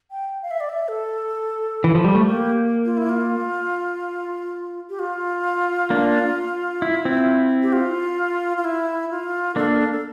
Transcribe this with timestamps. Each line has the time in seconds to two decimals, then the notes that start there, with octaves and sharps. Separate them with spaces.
0.11 G5
0.43 F5
0.51 E5
0.60 D5
0.69 E5
0.88 A4
1.84 E3
1.95 F3
2.04 G3
2.15 A3
2.24 A#3 G4
2.85 F4
2.97 E4
3.09 F4
4.90 G4
4.99 F4
5.90 A#3 D4
6.82 E4
7.05 C4 E4
7.62 G4
7.73 F4
8.57 F4
8.64 E4
9.11 F4
9.56 A#3 D4 A4
9.76 A#4
9.79 A4
9.92 A4